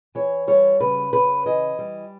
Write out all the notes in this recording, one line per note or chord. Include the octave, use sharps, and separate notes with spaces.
E3 C#5
G3 C#5
C#3 B4
C#3 B4
E3 D#5
G3